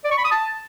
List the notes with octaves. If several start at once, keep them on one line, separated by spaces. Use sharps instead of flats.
D5
C#6
B5
D#6
A5